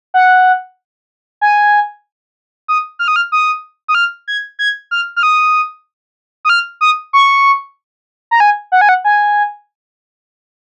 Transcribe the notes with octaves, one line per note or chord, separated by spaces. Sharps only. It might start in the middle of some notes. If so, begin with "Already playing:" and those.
F#5
G#5
D#6
F6
D#6
F6
D#6
D#6
F6
G#6
G#6
F6
F6
D#6
D#6
F6
D#6
C#6
A#5
G#5
F#5
G#5
F#5
G#5